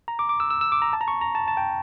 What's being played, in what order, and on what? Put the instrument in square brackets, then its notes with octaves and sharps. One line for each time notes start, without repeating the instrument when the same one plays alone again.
[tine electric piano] A#5
D6
D6
E6
E6
E6
D6
A#5
A5
A#5
C#6
A#5
A5
A5
G5